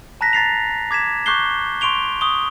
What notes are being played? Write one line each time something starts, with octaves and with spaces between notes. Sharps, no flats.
A5 A#5 F#6 A#6 B6
A#5 A6 C7 F7
D6 G#6 B6 E7
C#6 D6 F#6 G6 C7 G7
C6 C#6 D7 F7 G7
C#6 D#6 G7